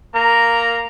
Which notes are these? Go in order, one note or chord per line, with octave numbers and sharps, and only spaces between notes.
A#3 A#5